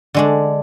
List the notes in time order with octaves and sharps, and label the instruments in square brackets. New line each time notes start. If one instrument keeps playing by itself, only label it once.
[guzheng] D3 G#3 D4